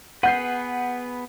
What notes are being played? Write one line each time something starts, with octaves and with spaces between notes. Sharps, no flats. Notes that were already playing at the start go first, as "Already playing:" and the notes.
B3 G#4 B4 F#5 G6 C7